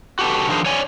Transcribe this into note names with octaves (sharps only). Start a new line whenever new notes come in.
F#4 G4 A4 B4
D#3 F3 D4 G#4 A#4 C5
C#5 D5 G#5